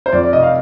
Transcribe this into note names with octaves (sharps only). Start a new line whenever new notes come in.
C5
F2 D5
D5
F1 D#5
F5